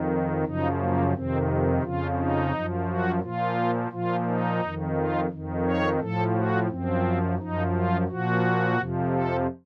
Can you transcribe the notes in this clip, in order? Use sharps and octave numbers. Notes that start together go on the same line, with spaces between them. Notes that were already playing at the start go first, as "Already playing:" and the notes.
Already playing: F2 D#3
F#2 C#3 F3 D#4
A#3
F2 C3 D#3 C4
F2 C#3 F3 F4
D#4
F#2 F3
F#4
A#2 F3 F4
A#2 F3 F4
D#4
F2 D#3
F4
F2 D#3
C#5
A2 F3 A4
F#4
F#2 F3 C4
F#2 F3 D#4
F4
A#2 F3 F#4
F2 C3 F3
A4